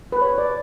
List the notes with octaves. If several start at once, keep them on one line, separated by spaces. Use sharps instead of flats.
B4
C#5
D5